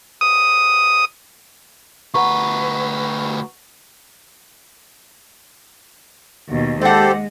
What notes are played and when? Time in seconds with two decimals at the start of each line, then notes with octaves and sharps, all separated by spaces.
0.21 D#6
2.14 D2 B4 F#5 A#5 C#6
6.49 D#2 B2
6.81 G#3 G4 A4 C5 D5 F#5